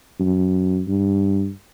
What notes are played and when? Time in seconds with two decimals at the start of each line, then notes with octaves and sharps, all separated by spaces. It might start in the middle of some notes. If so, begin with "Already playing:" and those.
0.19 F#2
0.88 G2